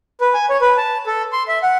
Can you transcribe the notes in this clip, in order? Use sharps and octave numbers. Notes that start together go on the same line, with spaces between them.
B4
G#5
C#5
B4
A5
A4
C6
E5
F#5